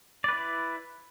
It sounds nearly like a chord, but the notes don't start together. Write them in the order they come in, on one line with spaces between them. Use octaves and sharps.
D5 B4 E4